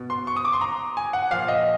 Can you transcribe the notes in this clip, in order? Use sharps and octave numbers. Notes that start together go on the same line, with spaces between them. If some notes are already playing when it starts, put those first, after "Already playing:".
Already playing: B2
C6
C#6
D#6
D6
C6
A#5
G#5
F#5
A#2 F3 F5
D#5